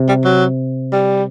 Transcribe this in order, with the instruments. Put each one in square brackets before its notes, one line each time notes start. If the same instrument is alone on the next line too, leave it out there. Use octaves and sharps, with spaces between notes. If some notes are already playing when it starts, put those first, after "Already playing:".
Already playing: [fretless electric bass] C3
[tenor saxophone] G3
F#3
G3